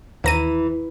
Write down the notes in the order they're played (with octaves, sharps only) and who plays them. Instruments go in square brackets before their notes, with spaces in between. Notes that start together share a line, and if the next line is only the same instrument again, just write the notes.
[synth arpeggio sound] D#2 A#5 D#7 [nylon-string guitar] E3